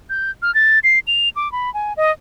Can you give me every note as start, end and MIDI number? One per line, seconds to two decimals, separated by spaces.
0.10 0.31 91
0.42 0.54 89
0.55 0.79 93
0.84 0.99 96
1.07 1.29 101
1.36 1.51 86
1.52 1.72 83
1.74 1.93 80
1.97 2.11 75